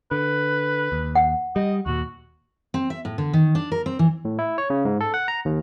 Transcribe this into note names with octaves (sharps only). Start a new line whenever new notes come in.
D3 B4
D#2
F#5
G3 D#5
D#2 A#2 F#4
C4
E5
A2
D3
D#3
D4
A#4
C4
E3
A2
E4
C#5
C#3
G#2
A4
F#5
A#5
D#2